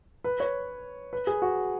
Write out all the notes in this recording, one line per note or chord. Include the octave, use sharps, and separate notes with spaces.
B4
C#5
B4
G#4
F#4